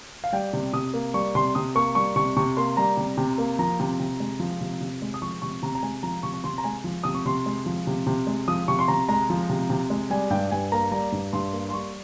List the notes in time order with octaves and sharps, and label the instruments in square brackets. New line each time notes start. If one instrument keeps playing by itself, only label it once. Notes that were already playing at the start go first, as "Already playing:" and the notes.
[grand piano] F5
G3 G5
C3
C3 D#6
A#3
G3 C#6
C3 C6
C3 D#6
A#3 C#6
G3 C#6
C3 C#6
C3 C#6
A#3 C6
G3 A#5
C3
C3
A#3
F3 A#5
C3
C3
G#3
F3
C3
C3
G#3
D#6
F3 C#6
C3 C#6
C3 A#5
A#5
G#3 G#5
F3 A#5
C3 C#6
C#6
C3 C6
A#5
G#3 G#5
F3
C3 D#6
C#6
C3 C6
G#3
F3
C3
C3
G#3
F3 D#6
C3 C#6
C6
C3 A#5
G#3 A#5
F3
C3
C3
G#3
G3 G#5
G2 G5
G2 G#5
A#3 A#5
G3 A#5
G2
G2 C6
A#3
C6
G3 C#6